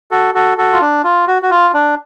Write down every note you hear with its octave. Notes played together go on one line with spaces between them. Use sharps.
F#4 A4
F#4 A4
F#4 A4
F4
D4
F4
F#4
F#4
F4
D4